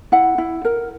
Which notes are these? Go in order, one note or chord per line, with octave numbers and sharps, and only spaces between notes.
E4 F#5
E4
A#4